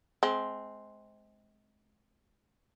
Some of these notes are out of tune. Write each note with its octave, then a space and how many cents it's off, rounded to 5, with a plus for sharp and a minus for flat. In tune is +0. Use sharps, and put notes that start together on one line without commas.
G#3 +30 C4 +0